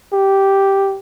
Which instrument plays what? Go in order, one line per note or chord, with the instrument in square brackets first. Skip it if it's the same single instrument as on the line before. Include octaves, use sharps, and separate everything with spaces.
[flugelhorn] G4